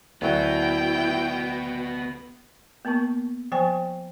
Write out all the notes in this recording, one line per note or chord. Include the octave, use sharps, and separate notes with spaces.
D2 F#3 B3 E4 F#4 G5 A#5
A#3 B3 A#4 A5 C#6
F3 C5 G5 G#5 C#6